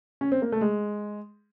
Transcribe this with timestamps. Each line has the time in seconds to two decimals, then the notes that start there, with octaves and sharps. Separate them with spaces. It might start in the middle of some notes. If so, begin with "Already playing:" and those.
0.21 C#4
0.32 C4
0.42 A#3
0.52 A3
0.61 G#3